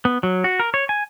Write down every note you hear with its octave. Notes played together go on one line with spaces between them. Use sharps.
B3
F#3
F#4
A#4
C#5
G#5